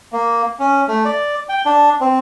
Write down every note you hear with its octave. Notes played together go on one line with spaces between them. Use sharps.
A#3
C#4
A3
D5
G5
D4
C4